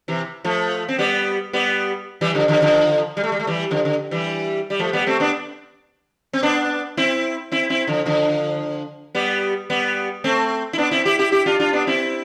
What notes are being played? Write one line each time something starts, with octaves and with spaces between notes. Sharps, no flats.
C3 E3
F3 A3
C4
G3 B3
G3 B3
E3 G3
D3 F3
D3 F3
D3 F3
G3
A3
G3
A3
E3 G3
D3 F3
D3
E3 G3
G3
F3 A3
G3 B3
A3 C4
B3 D4
C4
B3 D4
C4 E4
C4 E4
C4 E4
D3 F3
D3 F3
G3 B3
G3 B3
A3 C4
E4
B3 D4
C4 E4
E4 G4
E4 G4
E4 G4
D4 F4
D4 F4
B3 D4
C4 E4